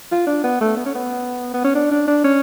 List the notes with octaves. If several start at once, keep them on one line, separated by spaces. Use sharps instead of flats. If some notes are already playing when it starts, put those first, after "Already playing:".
F4
D4
B3
A3
B3
C#4
B3
B3
C#4
D4
D4
D4
C#4